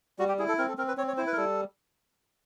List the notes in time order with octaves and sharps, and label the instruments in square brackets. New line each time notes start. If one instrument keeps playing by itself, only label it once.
[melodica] G3 F#4
G4
E4 G#4
A4
C4 A#4
A4
C4 A#4
B4
C4 C#5
C#5
E4 C5
B4
A#4
G3 A4